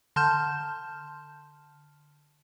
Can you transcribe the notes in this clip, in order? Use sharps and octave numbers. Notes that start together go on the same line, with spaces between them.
D3 A5 C6 F6 G6 E7